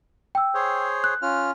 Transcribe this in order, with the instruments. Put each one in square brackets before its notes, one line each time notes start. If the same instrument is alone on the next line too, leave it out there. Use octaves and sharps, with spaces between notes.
[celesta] G5 E6
[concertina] G#4 C5 C#5
[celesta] F#6
[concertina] C#4 F4 F6